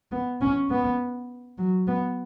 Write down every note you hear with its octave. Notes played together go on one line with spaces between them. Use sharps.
B3
C#4
B3
F#3
B3